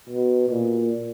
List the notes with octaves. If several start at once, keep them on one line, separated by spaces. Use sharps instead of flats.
B2
A#2